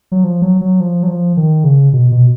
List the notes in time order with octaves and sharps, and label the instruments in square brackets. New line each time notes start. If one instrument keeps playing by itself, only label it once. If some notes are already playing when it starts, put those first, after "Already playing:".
[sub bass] F#3
F3
F#3
F#3
F3
F#3
F3
D#3
C#3
B2
B2